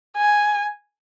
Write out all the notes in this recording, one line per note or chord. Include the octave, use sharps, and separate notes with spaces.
G#5